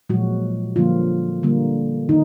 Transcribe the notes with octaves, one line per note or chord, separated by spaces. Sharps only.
A#2 F3 F#3 G#3 F#4
D3 F3 G3 A#3 F4
D3 G3 A#3
D#3 D#4